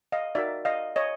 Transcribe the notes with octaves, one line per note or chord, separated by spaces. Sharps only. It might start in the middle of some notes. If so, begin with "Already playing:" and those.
D#5 F5
D#4 F#4 A#4 D5 E5
D#5 F5
C#5 D#5